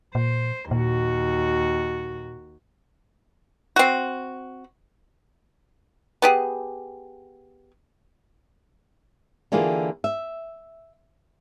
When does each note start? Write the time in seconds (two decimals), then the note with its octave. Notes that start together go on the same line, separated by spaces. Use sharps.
0.15 A#2 C5
0.71 D#2 A#2 F#4
3.76 C4 F#4
6.22 B3 G4 G#4
9.52 D3 E3 A#3 F4 G4 G#4
10.04 E5